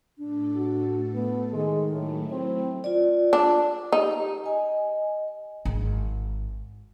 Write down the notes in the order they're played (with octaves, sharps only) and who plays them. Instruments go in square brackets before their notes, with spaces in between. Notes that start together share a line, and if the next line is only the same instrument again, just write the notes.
[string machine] A2 A4 [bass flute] D4
[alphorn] F#4
[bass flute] A3 [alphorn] B3
[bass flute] D#3 [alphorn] G#3
[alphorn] A2 [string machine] F#3 A3
[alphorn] C4 [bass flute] E4
[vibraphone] F4 D5
[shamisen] D4
[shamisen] D#4 [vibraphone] G4
[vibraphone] D#5 G#5
[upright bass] G#1